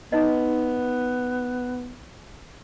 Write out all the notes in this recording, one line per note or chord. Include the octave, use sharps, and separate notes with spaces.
B3 D#4 D#5